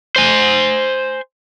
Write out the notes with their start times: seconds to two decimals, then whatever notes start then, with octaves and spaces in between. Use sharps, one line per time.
0.16 C5 G#5